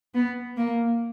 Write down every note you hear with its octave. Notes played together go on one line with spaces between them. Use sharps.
B3
A#3